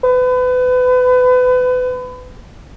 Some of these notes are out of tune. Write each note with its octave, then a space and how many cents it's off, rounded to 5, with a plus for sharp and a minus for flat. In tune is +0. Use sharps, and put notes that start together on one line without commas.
B4 +30